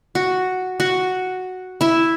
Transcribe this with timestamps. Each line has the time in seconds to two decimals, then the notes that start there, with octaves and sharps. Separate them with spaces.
0.15 F#4
0.80 F#4
1.81 E4 E5